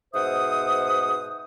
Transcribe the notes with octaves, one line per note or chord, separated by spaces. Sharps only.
G#2 B2 C5 E5 F#5 D#6